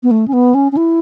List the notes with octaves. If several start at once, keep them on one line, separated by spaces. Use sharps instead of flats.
B3
A3
C#4
B3
C#4
C#4
E4